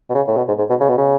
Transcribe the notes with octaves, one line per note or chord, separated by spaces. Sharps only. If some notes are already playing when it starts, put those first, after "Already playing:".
B2
C#3
A2
B2
G#2
G#2
B2
C#3
B2
C#3